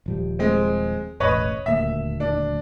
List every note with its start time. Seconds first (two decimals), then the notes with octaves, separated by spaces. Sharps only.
0.06 D#1 F3 G3
0.39 G#3 C4
1.20 E1 A1 B4 C#5 D#5
1.66 D#1 D2 A#3 E5
2.20 D4